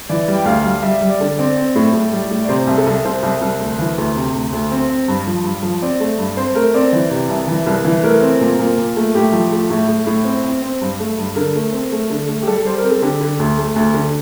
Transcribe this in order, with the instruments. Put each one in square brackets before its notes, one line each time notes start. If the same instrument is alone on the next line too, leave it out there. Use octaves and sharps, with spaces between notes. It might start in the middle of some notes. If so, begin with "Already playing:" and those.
[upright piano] E3 D5
G3
G5
D2 F5
G3 F5
G3 E5
G3
D5
D3
C4 D5
C4
A2
A2
G3
A2
D5
C3 C5
C2
A4
C2
C2 C5
C2
C2
D2
E3
D2
C3
D2
D2
C4
C4
G2
F3
G2
F3
C4 D5
A3
G2
C4 C5
A3 A#4
C4 D5
E3
C3
C2
E3
C2
E3
A3 A#4
C4
A#2
A#2
A#2
A3
A2 G4
F3
A3
A2
A2
A2
C4
C4
C4
G2
A3
G2
D3 A#4
A3
C4
A3
D3
A3
G4
G3 A4
G3 C5
A#4
C4
A4
D3 G4
D3
D2
A3
D2
D3